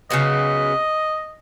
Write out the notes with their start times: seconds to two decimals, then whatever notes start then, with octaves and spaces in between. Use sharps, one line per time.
0.10 C#3 F#3 B3 D#5